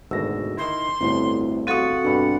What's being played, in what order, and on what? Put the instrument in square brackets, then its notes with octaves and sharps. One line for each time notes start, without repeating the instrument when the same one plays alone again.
[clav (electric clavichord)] G#1 D2 B2 [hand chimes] E6 A#6
[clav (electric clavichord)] D#3 E4 [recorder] C6
[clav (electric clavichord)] G1 D2 A2 [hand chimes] A3 C4 E4
[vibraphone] C4 F#4 A4 [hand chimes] F5 C#6 D#6 [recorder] F#5
[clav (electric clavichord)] G2 B2 [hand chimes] D4 B5